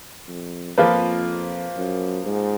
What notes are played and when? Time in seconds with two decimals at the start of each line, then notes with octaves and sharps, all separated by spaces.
0.28 F2
0.78 F2 F3 A#3 F4 B4
1.77 F#2
2.27 G#2